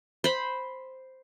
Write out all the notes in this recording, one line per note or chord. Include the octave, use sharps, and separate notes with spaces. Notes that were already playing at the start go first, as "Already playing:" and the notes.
C5 B5